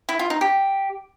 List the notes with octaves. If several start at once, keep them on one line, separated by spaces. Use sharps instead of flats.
E4
F4
D#4
G4